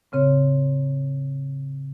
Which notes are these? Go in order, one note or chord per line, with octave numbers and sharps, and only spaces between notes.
A2 C#3 C4 C#5